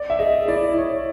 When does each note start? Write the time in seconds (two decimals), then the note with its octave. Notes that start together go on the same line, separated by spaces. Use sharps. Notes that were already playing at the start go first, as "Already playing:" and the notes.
Already playing: D5
0.10 E5
0.19 G#4 D#5
0.48 E4 D5
0.78 C#5